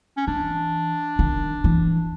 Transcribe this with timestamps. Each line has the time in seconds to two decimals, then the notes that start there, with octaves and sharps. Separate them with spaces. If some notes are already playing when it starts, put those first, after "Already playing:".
0.17 C#4
0.27 E3 D4
1.19 D#3
1.64 E3